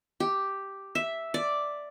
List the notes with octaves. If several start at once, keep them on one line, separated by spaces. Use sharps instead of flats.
G4
E5
D5